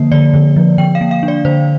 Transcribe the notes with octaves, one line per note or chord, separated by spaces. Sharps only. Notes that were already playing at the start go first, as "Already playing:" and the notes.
Already playing: D3 F3 A#3
D3 D5
D3
F3
D3 G5
F5
A#3
F5
D4
D5
D3 C5